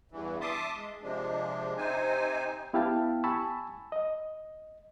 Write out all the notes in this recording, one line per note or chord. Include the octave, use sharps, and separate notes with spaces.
E2 G2 E3
E5 A5 C6 D6 D#6
G#3
C3 F3 G#3 D4
C3 C4 D#4 C5 G#5
B3 E4 G4 F5 G5 A5
G#5 A5 B5 C#6 E6
D#5